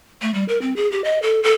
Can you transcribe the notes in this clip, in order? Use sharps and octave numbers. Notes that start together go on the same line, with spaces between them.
A3
G3
A#4
C4
G#4
G4
D#5
A4
A4